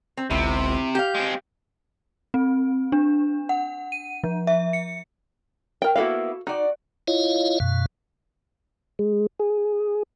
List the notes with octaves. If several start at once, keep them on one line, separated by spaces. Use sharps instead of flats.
C4
G1 C#2 C3 E4
G4 F5 G6
G#3 C4
C4
D4
F#5
D#7
F3
E5
C#7
A#4 G5
A#3 B3 E4 F#4 A4 F5
D#4 F#4 D5
E4 F4 C#5 D#5 F5
F#2 B2 F5
G#3
G#4